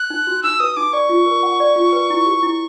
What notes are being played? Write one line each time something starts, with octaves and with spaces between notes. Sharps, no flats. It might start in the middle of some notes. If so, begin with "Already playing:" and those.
Already playing: F#6
D#4
F#4
D#4 E6
B4 D#6
D#4 D6
D5 C#6
F4
A#4
F#5
D5
F4
B4
E4
G4
E4